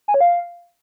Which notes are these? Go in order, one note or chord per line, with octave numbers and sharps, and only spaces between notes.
G#5
C#5
F5